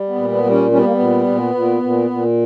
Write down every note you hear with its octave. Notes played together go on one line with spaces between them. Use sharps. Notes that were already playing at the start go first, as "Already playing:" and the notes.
Already playing: G3
B3
A#2
B3
G3
C#4
G3 C#4
B3
A#3
B3
A#2
A#2
A#2
A#2
A#2